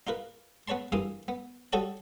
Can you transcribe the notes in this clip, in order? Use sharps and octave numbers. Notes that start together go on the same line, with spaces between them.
D#4 F4 A#4 B4
B3 B4 C#5 A5 C6
G2 E3 A#3 F4 D#6
B3
G3 F#4 A4 C#5 A5 D#6